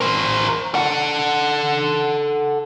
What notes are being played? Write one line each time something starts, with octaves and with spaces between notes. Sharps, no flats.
A#4 C5
A4 F#5